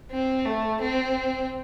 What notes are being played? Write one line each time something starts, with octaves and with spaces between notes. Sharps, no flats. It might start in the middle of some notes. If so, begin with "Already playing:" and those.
C4
A3
C4